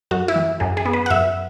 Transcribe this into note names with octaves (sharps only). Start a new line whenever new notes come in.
F#2 F#4
E4
E3
F#2 G#4
G#4
B3
B4
F#5
F#2 E5